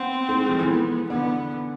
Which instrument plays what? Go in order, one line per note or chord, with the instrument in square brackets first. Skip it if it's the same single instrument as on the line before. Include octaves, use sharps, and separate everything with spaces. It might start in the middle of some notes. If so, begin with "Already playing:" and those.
Already playing: [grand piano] B3 [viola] C4
[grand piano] A3
G#3
F3
E3
[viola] B3
[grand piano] D3 [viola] B3